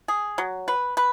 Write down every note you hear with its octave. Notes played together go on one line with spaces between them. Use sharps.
G#4
F#3
B4
B4